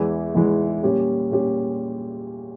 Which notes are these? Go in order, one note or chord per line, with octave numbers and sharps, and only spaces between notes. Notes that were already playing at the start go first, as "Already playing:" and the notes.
Already playing: E2 E3 G#3 E4
E2 E3 G#3 E4
A#2 G3 C#4 G4
A#2 G3 C#4 G4